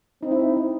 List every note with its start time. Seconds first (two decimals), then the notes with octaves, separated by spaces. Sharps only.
0.23 C4 D#4
0.31 E4
0.39 D#4
0.57 D#4